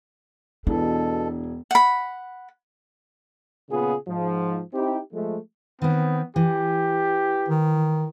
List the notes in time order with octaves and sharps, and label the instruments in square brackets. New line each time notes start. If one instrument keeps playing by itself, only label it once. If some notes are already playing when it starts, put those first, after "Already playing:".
[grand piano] E1 E3 [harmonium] B2 A4 [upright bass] D4
[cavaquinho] F#5 B5
[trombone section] A#2 C#3 B3 F4 G#4
G#2 F3
C4 D#4 E4 G4
F3 G#3 A3
[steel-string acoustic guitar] D#3 C4 [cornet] B3
[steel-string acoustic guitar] E3 [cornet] G4
[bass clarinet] D#3